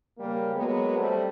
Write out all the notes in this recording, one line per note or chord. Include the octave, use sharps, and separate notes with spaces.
C#3 G3 A#3
F#3 G#3 A#3 B3
G3 A3 C4